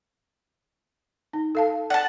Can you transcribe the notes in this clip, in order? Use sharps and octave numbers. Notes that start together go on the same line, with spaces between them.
D#4
A4 F5 A5
D5 F#5 A5